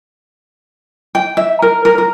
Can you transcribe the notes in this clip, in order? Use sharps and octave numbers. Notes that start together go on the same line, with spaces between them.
G5
E5
A#4
A#4
A#4